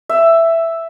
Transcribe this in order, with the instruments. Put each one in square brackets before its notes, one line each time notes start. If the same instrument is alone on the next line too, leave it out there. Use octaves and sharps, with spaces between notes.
[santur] E5